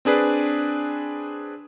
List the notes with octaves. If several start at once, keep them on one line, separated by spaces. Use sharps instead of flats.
C4 D4 G#4 B4 D5